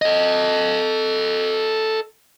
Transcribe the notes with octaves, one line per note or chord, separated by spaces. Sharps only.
A4 D#5